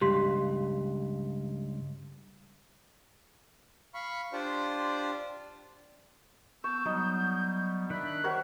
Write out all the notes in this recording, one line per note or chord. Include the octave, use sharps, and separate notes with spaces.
C#2 G2 G4 C6 B6
F5 B5 C#6
D4 F4 G4 C5 D5
B3 A5 C#6 E6 G6
F#3 G3 B3 D#4
D#3 D4 D5 E5 B5 F#6
F#4 A#4 C5 C#5